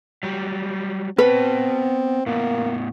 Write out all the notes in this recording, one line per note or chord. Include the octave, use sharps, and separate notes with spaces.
F#3 G3
B3 C4 B4 A5
A2 A#3 B3